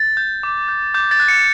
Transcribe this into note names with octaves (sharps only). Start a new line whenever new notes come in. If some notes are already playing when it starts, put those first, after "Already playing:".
Already playing: A6
G6
D6
G6
D6 G6
A6
F#6
C#7